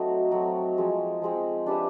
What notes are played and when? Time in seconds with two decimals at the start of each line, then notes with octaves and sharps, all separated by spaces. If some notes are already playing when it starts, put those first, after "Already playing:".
Already playing: F#3 A3 C4 D#4 F#4
0.32 F#3 A3 C4
0.77 F3 G#3 C4
1.22 F3 G#3 C4
1.66 D4 G4 B4 E5